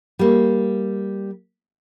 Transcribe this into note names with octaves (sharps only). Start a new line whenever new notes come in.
G3 A#3